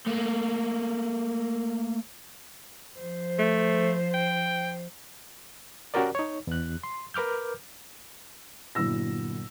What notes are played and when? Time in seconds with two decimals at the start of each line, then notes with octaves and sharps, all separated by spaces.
0.07 A3 A#3
3.00 F3 C5
3.39 A3
4.14 G5
5.94 C#4 F#4 G4 A#4 D5
6.15 D#4 C#5
6.47 E2 F#6
6.83 C6
7.14 A#4 B4 D6 F6 G6
8.75 G1 A#2 F#3 E4 E6 A#6